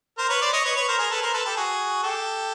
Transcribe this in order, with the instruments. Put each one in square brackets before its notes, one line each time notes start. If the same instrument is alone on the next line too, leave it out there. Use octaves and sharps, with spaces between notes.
[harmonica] A#4 C5
B4 C#5
C5 D5
C#5 D#5
B4 C#5
B4 C#5
A#4 C5
G#4 A#4
A4 B4
A#4 C5
A4 B4
G4 A4
F#4 G#4
G4 A4